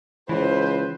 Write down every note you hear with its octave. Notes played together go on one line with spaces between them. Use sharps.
C#2 E3 B4 C5